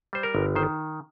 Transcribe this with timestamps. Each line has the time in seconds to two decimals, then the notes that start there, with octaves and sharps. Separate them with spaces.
0.13 G3 C5
0.23 A#4
0.35 G1
0.56 D#3 C5